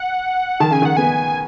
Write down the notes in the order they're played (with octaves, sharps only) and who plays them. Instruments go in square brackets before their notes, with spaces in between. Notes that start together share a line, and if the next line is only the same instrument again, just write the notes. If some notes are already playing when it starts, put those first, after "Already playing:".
Already playing: [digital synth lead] F#5
[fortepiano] D#3 [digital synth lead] A5
[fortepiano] C#3 [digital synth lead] G#5
[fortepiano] D#3
[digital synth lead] F#5
[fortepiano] B3 [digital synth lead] G#5